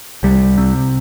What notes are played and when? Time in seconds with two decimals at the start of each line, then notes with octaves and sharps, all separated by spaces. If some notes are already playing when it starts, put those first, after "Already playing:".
0.23 C2 G3
0.58 C3